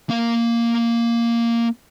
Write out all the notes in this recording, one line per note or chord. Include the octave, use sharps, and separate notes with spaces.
A#3 F5